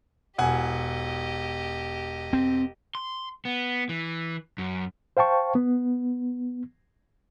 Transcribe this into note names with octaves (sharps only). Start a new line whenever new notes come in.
E1 G4 D#5 F#5 G#5
C4
C6
B3
E3
F#2
C5 F5 G5 A5 C#6
B3